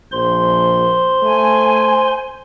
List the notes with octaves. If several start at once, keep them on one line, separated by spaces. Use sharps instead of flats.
A#1 C5 C6
A3 G#5